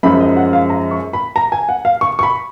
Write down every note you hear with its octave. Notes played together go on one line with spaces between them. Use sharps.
F#2 F3 G#3 D#4 B5
D#5
F#5
F5
A#5
C#6
B5
A#5
G#5
F#5
F5
C#6
C#6
B5